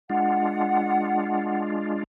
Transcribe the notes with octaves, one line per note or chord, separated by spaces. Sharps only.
G#3 D4 F4 F#5